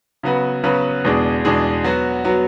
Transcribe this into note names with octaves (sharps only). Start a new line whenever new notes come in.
C#3 F#3 B3 F#4 B4
C#3 F#3 B3 F#4 B4
E2 B2 G#3 D4 G#4
E2 B2 G#3 D4 G#4
F#3 B3 F#4
F#3 B3 F#4